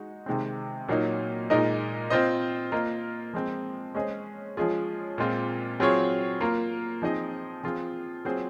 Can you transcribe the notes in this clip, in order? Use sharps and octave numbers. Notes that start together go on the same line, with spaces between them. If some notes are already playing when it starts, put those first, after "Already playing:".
Already playing: G#3 D#4 F#4
C3 D#3 G#3 C4
A#2 F#3 A#3 D#4
A#2 G#3 D#4 A#4 D#5
C4 F4 C5 D#5
A#3 F4 A#4 D#5
F3 G#3 C4
G#3 C#4 G#4 C5 D#5
F3 G#3 C#4 F4 G#4
A#2 G#3 C4 F4
F#3 C4 F4 G#4 C#5
A#3 F4 A#4
F3 C4 D#4 G#4 D#5
F3 C4 F4 G#4
F#3 C4 F4 G#4 C5